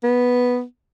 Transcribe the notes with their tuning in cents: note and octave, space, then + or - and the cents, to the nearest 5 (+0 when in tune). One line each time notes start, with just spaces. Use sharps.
B3 -5